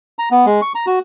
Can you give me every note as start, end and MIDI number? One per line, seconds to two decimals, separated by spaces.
0.19 0.29 82
0.31 0.46 59
0.46 0.61 56
0.62 0.72 85
0.75 0.86 82
0.87 0.99 66